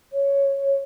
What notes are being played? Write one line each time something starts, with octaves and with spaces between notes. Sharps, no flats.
C#5